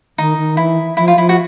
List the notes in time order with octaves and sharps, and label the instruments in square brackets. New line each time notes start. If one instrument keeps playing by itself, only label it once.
[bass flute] D#3 [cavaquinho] D#4
[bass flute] D#3
[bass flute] E3 [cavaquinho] E4
[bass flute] F3 [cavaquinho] E4
[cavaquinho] F4
[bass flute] F3 [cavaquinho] E4
[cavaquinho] F#4